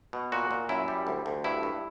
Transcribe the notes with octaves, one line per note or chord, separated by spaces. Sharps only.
B2
A#2 F#4
A#2
F#2 E4
G3
D2
D2
G2 E4
G2